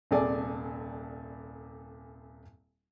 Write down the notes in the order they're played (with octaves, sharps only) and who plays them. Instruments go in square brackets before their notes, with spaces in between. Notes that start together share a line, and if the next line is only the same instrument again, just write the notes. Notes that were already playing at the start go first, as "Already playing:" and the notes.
[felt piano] D#1 C2 G#4 A4 D5 G#5